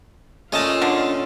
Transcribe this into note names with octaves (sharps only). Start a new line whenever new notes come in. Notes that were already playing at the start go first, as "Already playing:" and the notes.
A#2 A3 C#4 F4 C#5 D#5 A5
D3